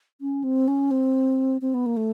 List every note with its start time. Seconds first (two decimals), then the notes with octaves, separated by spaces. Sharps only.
0.21 C#4
0.44 C4
0.68 C#4
0.91 C4
1.61 C4
1.74 B3
1.86 A#3
1.97 A3